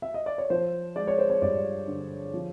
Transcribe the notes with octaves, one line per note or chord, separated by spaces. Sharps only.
E5
D#5
D5
C#5
F3 C5
G#3 D5
C#5
C5
C#5
G2 D5
D3
F3